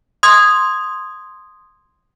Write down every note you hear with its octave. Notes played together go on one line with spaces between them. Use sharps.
C6 D#6 G#6